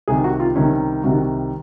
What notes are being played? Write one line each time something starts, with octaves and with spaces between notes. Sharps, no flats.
C2 C3 D#3 G#4
F#4
F4
C2 C3 D#3 C#4
C2 C3 D#3 F#4